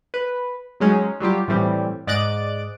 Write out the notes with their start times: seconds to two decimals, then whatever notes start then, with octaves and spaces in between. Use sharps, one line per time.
0.14 B4
0.80 F#3 G#3 C#4 D#4
1.20 F#3 G3 F4 G4
1.48 A2 E3 G3 C4
2.07 G#2 D5 D#5 F#6 A6 D7